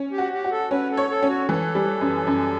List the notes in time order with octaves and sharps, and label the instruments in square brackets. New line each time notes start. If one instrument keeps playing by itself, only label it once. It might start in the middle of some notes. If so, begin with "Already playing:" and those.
Already playing: [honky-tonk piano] C#4
[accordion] G4
[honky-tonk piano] F#4
[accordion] G4
[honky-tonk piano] F#4
[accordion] A4
[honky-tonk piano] C#4 [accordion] B4
[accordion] A4
[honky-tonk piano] C#5
[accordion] A4
[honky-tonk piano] C#4
[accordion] F#4
[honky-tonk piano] E3 [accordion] A4
[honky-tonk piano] G3
F#2
F#2